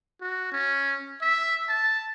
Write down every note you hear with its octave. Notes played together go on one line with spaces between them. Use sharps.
F#4
C#4
E5
A5